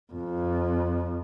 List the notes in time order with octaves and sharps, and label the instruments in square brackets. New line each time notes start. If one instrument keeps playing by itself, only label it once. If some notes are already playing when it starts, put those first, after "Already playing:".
[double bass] F2